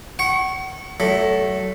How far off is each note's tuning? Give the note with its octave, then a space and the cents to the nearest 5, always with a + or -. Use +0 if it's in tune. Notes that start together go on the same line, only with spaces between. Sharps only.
F#5 +35 C#6 -20
F#3 +30 A3 +0